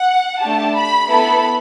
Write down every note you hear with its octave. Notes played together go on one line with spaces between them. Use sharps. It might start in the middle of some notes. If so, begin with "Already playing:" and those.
Already playing: F#5
A3 D4 G4 A5
B5
B3 E4 A4 B5